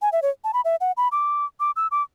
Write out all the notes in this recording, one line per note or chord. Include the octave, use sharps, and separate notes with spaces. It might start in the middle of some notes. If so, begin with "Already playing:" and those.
G#5
E5
C#5
A5
B5
E5
F#5
B5
D6
D6
E6
D6